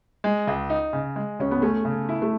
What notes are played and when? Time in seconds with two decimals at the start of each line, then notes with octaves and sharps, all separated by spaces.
0.24 G#3
0.47 C#2
0.70 D#4
0.93 C#3
1.16 G#3
1.40 C#2 C#4
1.51 B3
1.62 A3 C#4
1.85 C#3
2.09 E4
2.22 A3